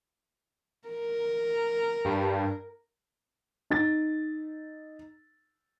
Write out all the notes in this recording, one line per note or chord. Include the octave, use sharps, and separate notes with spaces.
A#4
G2
D#4 A6